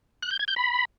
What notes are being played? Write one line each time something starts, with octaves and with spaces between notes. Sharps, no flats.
F#6
G6
G#6
G6
B5